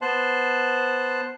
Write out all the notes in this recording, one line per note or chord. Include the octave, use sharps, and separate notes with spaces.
B3 C5 A5 C6 F#6